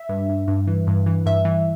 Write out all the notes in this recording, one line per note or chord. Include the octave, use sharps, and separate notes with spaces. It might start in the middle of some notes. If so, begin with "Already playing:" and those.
Already playing: E5
G2
G2
G2
E3
G2
E3
G2 E5
E3